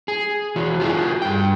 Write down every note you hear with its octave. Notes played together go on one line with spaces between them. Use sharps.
G#4
E3 F#4
F4 F#4 G#4
G2 G5